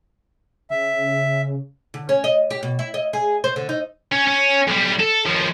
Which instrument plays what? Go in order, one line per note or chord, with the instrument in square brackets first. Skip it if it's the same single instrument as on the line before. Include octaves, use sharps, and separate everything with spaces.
[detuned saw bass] C#3 [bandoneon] E5
[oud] D3
C#4
D#5
G4
B2
E4
D#5
G#4
C5
D3
D#4
[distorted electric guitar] C#4
C#4
B1 G3
A4
D#2 F3